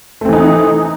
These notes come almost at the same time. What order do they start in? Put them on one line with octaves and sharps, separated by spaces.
A3 C4 E3 D#4